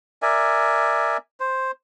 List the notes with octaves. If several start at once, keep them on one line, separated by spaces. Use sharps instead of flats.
A#4 D5 E5 G#5
C5